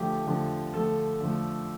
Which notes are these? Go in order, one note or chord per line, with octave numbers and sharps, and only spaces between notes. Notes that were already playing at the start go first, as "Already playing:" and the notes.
Already playing: D3 F3 A3 G4
D3 F3 A3
D3 F3 A3 A4
D3 F3 A3